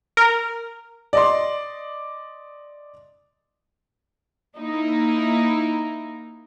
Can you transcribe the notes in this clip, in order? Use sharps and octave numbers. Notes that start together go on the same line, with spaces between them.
A#4
D5 D#5 C6
A#3 D#4 E4